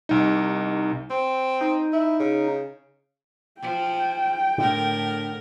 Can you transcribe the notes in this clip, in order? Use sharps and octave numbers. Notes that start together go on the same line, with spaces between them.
C2 D#4
C4
D#4
E4
C#3
F3 G5
A2 D3 A#4